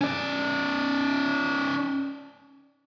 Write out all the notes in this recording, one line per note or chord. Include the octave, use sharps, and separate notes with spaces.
C#4 D5